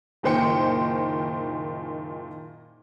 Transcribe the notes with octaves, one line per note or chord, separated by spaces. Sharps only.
F#1 A#2 D#3 C5 G5 C#7